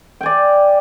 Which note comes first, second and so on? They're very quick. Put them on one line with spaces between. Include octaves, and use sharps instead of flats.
G5 G#5 D5